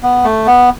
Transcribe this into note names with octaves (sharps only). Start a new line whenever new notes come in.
B3
A3
B3